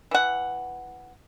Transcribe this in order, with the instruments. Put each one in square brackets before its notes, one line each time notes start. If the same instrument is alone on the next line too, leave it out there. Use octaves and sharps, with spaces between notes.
[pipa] E3 F#5